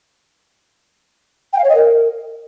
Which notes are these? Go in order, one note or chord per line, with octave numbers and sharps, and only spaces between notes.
G5
F5
C#5
D#5
A#4